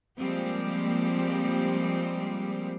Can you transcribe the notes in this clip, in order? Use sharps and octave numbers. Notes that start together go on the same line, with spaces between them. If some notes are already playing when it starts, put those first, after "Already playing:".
F3 G3 G#3 A#3 C4 G4